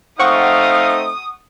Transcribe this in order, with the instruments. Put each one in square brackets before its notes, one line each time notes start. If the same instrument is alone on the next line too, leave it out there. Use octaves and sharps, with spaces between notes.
[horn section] A3 C4 D#4 [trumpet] F5 [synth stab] F#5 C#6 [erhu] D#6